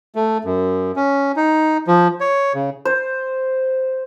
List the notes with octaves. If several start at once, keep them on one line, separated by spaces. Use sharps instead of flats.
A3
F#2
C#4
D#4
F3
C#5
C#3
C5